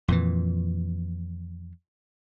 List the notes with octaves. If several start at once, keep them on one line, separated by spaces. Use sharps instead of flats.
F2 A#2 E3